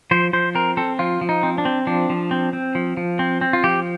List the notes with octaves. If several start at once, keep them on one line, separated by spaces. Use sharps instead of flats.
F3 C5
F3 C5
C4 A#4
C4 A4
F3 F4
F3
D#4
C4
D4
C4
F3 D4
F3
C4
C4
F3
F3
C4
C4
F4
F3 G4